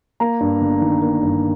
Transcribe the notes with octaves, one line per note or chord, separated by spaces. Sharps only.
A#3 A#5
G2
G1
D#3
A#3
G2